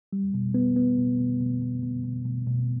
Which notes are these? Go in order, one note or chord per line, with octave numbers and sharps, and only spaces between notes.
G3
B2
B3
B3
B2
B2
B2
B2
B2
B2
B2
B2